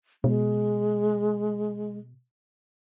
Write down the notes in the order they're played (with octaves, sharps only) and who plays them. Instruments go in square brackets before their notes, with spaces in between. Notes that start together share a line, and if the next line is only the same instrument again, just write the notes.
[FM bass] B2 [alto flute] G#3